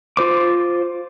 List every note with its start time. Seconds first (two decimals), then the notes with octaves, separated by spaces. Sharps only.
0.17 F4 C5 D6